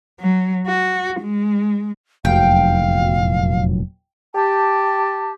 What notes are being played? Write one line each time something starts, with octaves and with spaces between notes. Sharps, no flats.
F#3
F#4
G#3
F1 E2 A#2 F#3 F5 G5
G4 A5